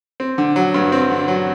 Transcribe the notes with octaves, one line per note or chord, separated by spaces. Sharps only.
C4
D3
F#3
G2
C4
D3
F#3